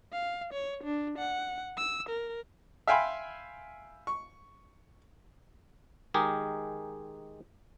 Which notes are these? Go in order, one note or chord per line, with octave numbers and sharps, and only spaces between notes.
F5
C#5
D4
F#5
E6
A#4
E5 F5 G5 G#5 B5 C6
C#6
D#3 G#3 G4 G#4 A#4